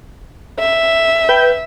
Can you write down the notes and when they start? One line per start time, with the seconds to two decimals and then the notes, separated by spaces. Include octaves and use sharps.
0.60 E5
1.29 B4 G5 G6